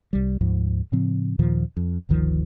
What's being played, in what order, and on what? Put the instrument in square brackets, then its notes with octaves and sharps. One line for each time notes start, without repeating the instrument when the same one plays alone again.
[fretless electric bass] C2 G3
D2 G#2 F3
A2 C#3 F3 C4
D#2 A#2 D#3 F3
F2
G1 D2 D#3 F3